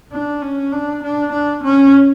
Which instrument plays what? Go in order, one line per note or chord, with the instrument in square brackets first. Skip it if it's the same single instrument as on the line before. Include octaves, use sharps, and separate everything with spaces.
[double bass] D4
C#4
D4
D4
D4
C#4